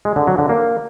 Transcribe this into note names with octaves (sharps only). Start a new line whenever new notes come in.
G#3
D3
F#3
D3
A#3